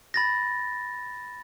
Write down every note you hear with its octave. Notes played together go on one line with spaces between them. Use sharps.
B5 A6 A#6